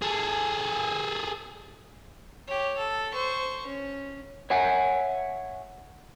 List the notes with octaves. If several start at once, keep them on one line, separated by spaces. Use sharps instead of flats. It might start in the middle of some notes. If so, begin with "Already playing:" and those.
G#4 A4
G4 C#5
A4
C5 C#6
C#4
C#5 E5 F#5 G#5